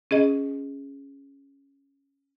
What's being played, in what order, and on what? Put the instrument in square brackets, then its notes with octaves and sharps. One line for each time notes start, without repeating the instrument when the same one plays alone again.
[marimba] C#4 G#4 D#5